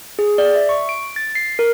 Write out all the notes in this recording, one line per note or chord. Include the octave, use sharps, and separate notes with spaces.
G#4
D5
E5
C#6
D7
A6
C7
A#4